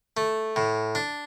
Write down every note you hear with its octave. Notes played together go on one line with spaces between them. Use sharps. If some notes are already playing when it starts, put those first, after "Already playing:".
A3
A2
D4